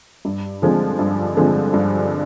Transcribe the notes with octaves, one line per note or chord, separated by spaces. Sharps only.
G2
D3 F3 G#3 C4
G2
D3 F3 G#3 C4
G2